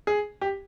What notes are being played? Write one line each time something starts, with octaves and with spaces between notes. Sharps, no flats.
G#4
G4